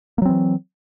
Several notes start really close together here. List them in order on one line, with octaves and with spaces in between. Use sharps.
A#3 F#3 C4 E3